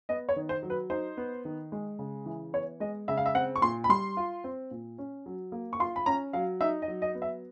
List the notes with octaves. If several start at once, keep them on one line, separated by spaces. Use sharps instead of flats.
B3 D#5
C#5
D#3
C5
F#3
B4
D#4 C5
B3
D#3
G#3
C#3
E3
B3 C#5
G#3 D#5
C#3 E5
F5
E5
C4 F#5
C#6
A#2 C6
B5
G3 C6
F4
C4
A#2
C#4
F#3
A#3
C#6
F4 C6
B5
C#4 A#5
F#3 F5
D#4 E5
D#5
F#3
D#5
B3
E5